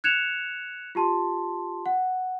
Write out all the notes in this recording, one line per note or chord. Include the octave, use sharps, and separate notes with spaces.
F#6 G#6 C#7 E7 F7
F4 G4 A5 C6
F#5